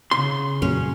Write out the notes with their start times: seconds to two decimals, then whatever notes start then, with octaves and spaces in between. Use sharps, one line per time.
0.11 C#3 C6
0.62 F#2 A#2 F#3 C#4